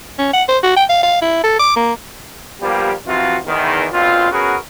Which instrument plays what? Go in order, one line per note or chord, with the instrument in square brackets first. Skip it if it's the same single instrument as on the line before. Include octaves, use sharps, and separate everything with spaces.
[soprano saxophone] C#4
F#5
C5
F#4
G5
F5
F5
E4
A4
D6
A#3
[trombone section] F3 G3 A#3 B3 G4
C3 E3 F3 C4 F4 F#4
E2 D#3
A#1 B2 C4 F4
B3 C#4 F#4 G#4 A#4 B4